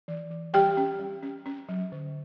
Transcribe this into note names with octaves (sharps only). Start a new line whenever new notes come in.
E3
E3
G3 G4 G5
C#4
G3
C#4
C#4
F#3
D3